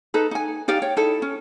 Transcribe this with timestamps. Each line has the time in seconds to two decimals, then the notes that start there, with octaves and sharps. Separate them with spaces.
0.14 D#4 A4 B4
0.31 D#4 G#5
0.68 D#4 G4 D5 F5
0.82 C#5 G5
0.97 D#4 E4 A4
1.22 C#4